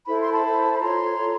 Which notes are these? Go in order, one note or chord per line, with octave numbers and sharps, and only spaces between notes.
E4 A4 C5 B5
C6
A5 B5
E4 A4 C5
B5
F4 A4 C#5 A#5 C6
F4 A4 C#5